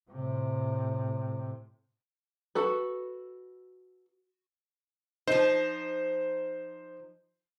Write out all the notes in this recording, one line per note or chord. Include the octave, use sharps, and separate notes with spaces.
A2 C3
F#4 A4 B4
F3 D#4 C5